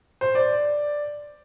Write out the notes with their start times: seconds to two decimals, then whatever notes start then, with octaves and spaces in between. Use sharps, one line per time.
0.21 C5
0.35 D5